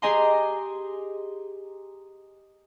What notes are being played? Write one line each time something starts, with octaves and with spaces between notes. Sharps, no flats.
G4 G#4 D#5 G#5 A#5 C6